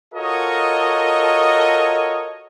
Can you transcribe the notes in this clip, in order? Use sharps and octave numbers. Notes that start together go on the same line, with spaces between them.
F4 F#4 A4 A#4 C#5 D#5